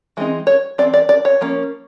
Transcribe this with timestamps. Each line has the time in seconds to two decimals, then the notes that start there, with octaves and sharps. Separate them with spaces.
0.17 E3 G#3 C4 D#4
0.47 C#5
0.78 E3 A3 C4 D5
0.94 D5
1.09 D5
1.25 C#5
1.41 F3 A#3 C#4